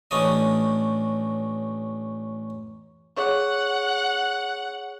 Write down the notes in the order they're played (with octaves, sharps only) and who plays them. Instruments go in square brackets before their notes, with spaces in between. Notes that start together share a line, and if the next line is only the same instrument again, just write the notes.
[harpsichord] A1 C#4 D4 D#5
[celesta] G#4 C#5 C#6 [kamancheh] F#5